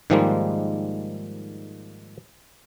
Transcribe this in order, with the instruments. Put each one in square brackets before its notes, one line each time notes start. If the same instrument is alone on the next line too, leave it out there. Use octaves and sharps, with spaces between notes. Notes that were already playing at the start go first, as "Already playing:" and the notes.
[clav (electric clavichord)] G#2 D#3 F3 G3 G#3 A#3